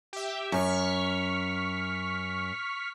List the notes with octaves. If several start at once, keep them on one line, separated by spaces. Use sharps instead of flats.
G4 E5
F#2 C#6 F6 B6